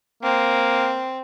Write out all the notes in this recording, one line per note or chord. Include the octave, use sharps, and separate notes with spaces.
A#3 C4